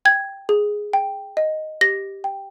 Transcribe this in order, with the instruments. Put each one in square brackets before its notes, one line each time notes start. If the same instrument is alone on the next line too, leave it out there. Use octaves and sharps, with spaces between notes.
[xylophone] G5 G#6
G#4
G5
D#5
G4 A#6
G5